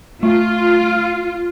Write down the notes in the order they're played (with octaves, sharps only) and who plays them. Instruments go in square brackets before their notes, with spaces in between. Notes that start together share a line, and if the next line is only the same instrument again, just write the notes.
[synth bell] A3 [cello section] F4